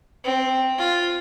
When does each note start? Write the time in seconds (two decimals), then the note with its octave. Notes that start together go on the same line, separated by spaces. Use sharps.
0.24 C4
0.78 F4